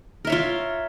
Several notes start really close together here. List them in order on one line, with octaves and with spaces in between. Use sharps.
A#4 E5 C#5 F4